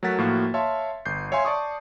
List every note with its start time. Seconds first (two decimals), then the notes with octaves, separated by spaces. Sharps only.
0.03 F#3 A3 A#4 F#5 A6 B6
0.18 A2 F3 A#3 F#4 F5
0.54 C#5 E5 F5 A5 C6
1.05 G1 G6 C7
1.32 C#5 E5 F5 G#5 C6
1.45 D5 A5 C#6 D#6